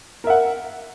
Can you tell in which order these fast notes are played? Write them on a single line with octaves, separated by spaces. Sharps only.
A#4 E5 F#5